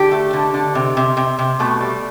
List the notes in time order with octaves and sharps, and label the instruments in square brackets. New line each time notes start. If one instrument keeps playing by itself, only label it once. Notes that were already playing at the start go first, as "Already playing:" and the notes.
Already playing: [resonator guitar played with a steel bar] D3 G4
A3
D3
D3
C3
C3
C3
C3
B2 A3
G3